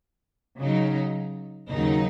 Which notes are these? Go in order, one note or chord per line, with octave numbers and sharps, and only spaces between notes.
C#3 F#3 D#4
D#2 C#3 F#3 D#4